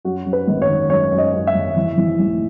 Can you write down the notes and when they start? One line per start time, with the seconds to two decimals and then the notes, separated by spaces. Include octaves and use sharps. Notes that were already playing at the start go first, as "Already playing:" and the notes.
0.05 F#2 F#4
0.25 F#2
0.33 B4
0.47 G#1
0.62 C#5
0.69 D#3
0.90 F#2 C#5
1.12 F#2
1.18 D#5
1.33 F#2
1.47 E5
1.54 G#1
1.76 E3
1.97 E3
2.19 A1